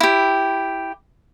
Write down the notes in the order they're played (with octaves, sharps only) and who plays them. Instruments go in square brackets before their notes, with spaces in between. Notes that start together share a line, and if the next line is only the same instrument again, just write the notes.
[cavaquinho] E4 G4